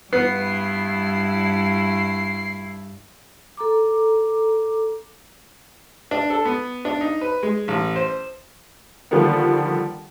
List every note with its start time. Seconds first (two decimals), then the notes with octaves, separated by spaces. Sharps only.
0.13 G2 B3 E4 C7
3.57 A4 A#5 D6
6.11 D4
6.30 A4
6.45 B3
6.85 D4
7.01 D#4
7.21 B4
7.43 G#3
7.68 A1
7.96 C5
9.11 D3 D#3 F3 G3 A#3 B3